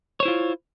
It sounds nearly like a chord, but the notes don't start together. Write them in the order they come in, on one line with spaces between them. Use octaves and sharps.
C#5 C5 E4 F4